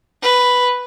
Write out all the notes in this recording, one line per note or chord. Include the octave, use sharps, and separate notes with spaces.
B4